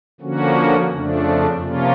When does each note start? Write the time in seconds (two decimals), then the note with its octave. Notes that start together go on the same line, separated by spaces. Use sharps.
0.20 D3 F3 A#3 C#4 F#4
0.91 F2 C#3 F3 A3 D4
1.60 C3 F3 A#3 C#4 F4